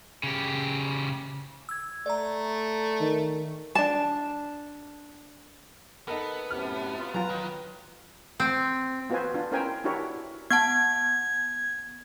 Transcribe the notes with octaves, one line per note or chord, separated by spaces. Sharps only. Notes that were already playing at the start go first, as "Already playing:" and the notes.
C#3 G4
E6 G#6
A3 D5 A#5
D#3
D4 A5
B3 D#4 A4 A#4
F#2 A2 C3 F6
F4
F#3 F4 B4 A#5
D#3
C4
B3 F4 F#4 B4 C5 G#5
D4 F4
C#4 E4 A#4 C5 G5 G#5
D4 E4 F#4 G4 A#4 C#5
B3 F#5 A5 G#6